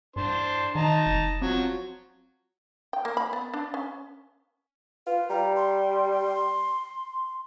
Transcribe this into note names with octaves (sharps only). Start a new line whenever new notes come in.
G2 D4 C5 C6
D#3 D#4 A5 A#5
F1
F3 F#3 C4
G5
A#3
B5
B3
D4
C#4
F4 B4
G3 A#5
C6